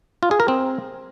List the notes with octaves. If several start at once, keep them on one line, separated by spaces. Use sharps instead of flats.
F4
G#4
A#4
C4